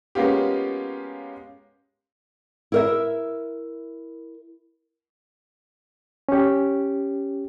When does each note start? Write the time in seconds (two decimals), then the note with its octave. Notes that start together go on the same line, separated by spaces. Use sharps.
0.15 G#3 A#3 B3 C#4 F4 G4
2.72 E4 A#4 E5
6.29 C#4 G4